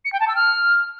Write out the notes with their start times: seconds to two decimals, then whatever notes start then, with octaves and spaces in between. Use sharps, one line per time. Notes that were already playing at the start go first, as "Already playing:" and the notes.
0.05 C#7
0.13 G5
0.20 A5
0.28 E6
0.36 F6